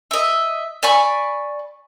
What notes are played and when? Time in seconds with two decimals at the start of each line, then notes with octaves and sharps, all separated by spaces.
0.11 D#5 E5
0.83 D5 G#5 B5 C#6